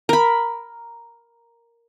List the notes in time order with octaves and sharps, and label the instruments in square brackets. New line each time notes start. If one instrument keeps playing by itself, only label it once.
[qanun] A#4 B5